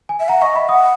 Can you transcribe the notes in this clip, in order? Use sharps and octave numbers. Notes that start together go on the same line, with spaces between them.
G#5
E5
F#5 A#5
D#5 C#6
E5 B5
F#5 D#6